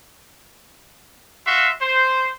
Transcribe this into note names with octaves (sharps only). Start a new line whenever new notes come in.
F#4 E5 F5 C6
C5